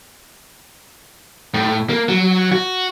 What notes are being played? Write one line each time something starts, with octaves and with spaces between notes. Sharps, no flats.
A2
A#3
F#3
F#4